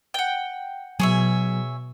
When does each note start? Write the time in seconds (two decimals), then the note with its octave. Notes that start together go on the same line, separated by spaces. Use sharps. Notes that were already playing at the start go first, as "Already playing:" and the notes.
0.14 F#5 G5
1.00 B2 F#3 G#4 C#5 E5